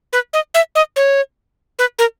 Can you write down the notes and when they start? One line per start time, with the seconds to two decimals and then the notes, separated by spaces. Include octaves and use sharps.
0.13 B4
0.33 D#5
0.54 E5
0.75 D#5
0.96 C#5
1.79 B4
1.99 A#4